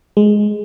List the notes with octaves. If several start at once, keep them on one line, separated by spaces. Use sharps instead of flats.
G#3